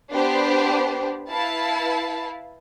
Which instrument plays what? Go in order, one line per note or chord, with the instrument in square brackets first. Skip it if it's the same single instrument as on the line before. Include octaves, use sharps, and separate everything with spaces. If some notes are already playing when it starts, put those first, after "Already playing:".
[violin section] B3 D4 G4 C5
E4 B4 F5 A5